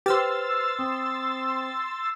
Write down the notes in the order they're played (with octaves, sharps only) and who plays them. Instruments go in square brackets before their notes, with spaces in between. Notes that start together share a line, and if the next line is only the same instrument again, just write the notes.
[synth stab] G4 [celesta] B4 C5 [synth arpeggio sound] C6 E6 A6 [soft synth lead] F6
[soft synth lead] C4 [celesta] D#6